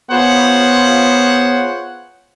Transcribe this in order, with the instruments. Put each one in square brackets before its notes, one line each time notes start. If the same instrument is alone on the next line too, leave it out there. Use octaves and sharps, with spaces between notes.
[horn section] B3 F4 G#4 C5 C#5 F#5